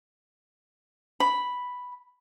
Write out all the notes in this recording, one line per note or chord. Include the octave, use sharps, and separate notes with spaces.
B5